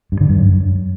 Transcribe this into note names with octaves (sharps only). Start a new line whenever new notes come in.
G2
D3
G2
F#2